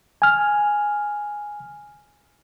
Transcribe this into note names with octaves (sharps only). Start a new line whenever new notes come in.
G#5 F6